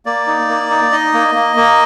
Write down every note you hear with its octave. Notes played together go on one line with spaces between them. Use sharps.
A#3 D5
D#4
A#3
D#4
D#4 D#5
A#3
A#3
A#3